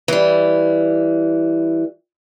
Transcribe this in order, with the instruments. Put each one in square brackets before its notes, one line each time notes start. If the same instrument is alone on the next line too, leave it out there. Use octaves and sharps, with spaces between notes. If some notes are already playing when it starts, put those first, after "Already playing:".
[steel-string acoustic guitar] E3 G3